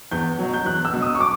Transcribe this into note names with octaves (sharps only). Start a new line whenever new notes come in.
E2 G6
B2 F#3
G6
E2 F#6
E6
B2 F#3
D#6
C#6
D6